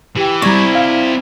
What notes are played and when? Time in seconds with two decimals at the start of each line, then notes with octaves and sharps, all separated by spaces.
0.17 E3 G4 G5
0.42 G3 C4 E4 D5 A#5 C#6 G#6 A#6
0.75 F5